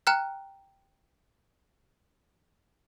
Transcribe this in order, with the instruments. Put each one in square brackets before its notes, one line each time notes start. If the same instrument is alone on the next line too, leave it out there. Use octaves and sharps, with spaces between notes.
[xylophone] G5 A#5 F6 F#6